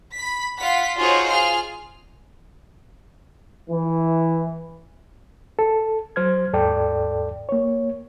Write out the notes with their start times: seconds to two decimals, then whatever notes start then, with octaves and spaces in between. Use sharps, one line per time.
0.17 B5 B6
0.58 F4 F#5 B6
0.99 D#4 F4 F#4 G#4 C5 C#5
1.31 F4 G#4 F6
3.70 E3
5.59 A4
6.16 F#3 C5 F6 G#6
6.53 D#2 G#2 A4 D5 G5
7.49 A#3 C#5